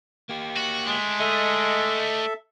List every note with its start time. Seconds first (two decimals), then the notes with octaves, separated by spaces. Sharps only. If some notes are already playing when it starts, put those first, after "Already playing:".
0.29 A#3 G4
0.56 F#4
0.86 G#3 A3 D4
1.20 A4 D#5 E5